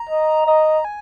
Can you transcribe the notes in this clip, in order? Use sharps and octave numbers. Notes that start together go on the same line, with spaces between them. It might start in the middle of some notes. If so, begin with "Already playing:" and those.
Already playing: A#5
D#5
D#5 A#5
G#5